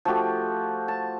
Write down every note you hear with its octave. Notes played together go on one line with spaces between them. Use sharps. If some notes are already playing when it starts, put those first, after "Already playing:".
F3 A3 F#4 G4
A5